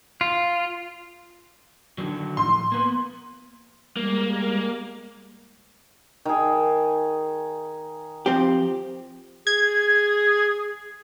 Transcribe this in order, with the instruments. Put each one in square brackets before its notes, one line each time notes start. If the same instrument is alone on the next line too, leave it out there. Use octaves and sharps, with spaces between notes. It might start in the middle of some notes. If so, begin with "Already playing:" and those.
[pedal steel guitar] F4
[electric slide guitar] D3 D#3 F#3
[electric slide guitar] A2 F3 [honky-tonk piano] C6
[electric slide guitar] A#3 B3
[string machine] G3 G#3 A#4 [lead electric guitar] A#3
[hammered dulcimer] D#3 G#4
[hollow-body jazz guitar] F3 C4 G4
[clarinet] G#4 [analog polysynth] G#6